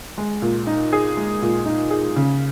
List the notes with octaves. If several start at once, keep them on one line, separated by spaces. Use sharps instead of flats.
G#3
A#2
D#4
G#4
G#3
A#2
D#4
G#4
C#3